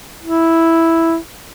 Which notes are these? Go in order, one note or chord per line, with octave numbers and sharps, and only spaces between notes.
E4